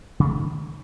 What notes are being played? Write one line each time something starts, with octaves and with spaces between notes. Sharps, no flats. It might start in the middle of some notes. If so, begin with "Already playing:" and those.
C#3
A3
D#3